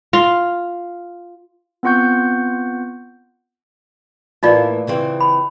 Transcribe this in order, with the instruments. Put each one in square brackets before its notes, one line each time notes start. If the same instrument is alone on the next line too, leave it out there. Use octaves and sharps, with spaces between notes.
[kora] F4
[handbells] B3 C4 F4 F#5 C#6 G6
[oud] A2 E3 A#3 [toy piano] D#4 F4 D5
[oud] C#3 E3 C4
[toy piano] B5